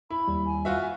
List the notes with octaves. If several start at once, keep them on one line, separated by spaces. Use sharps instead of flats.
E4 B5
D#2 G3
G#5
F4 F#4 E5
G#5